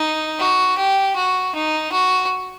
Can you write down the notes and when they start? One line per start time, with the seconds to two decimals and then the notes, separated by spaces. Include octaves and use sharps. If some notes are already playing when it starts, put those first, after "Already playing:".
Already playing: D#4
0.40 F#4
0.78 G4
1.16 F#4
1.55 D#4
1.92 F#4